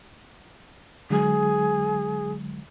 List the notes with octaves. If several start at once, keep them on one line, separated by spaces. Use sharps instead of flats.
D3 F#3 G#3 G#4